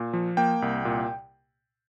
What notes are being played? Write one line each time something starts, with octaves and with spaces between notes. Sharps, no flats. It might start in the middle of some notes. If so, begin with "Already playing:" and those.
Already playing: A#2
F3
A#3 G5
C2
A#2